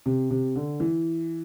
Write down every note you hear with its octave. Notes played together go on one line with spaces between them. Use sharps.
C3
C3
D3
E3